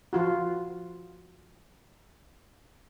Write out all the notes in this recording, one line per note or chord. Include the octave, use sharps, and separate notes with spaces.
F3 F4 F#4